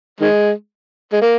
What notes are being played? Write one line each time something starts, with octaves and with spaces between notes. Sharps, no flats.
D#3 G#3
G#3
A#3